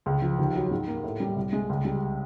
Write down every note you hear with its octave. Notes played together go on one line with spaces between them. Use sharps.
C#2
F3
D#2
F#3
G#2
A#3
A2
G3
C2
G#3
C#2
G3